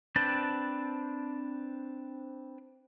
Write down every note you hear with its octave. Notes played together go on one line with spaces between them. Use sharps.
C4 D4 B4 G5 A5